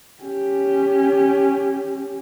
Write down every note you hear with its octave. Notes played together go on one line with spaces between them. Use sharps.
C#4 G4